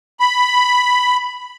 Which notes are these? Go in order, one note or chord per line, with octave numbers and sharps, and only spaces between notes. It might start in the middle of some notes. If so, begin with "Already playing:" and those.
B5